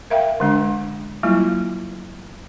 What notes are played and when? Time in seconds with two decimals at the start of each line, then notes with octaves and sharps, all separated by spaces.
0.10 A#4 E5 F5 G5
0.40 D3 G#3 D4
1.23 F#3 G3 A#3 E4 F4